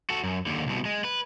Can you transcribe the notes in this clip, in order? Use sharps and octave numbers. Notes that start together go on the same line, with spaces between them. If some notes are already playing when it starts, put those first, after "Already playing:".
F#4 A4
F#2
D#2 D3
C2 B2
G#3
B4